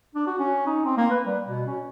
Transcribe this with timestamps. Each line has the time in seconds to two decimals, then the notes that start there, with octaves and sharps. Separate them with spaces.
0.15 D4
0.27 F#4
0.39 C#4
0.66 D#4
0.85 C4
0.97 A#3
1.11 B4
1.25 G3
1.47 B2
1.67 C#4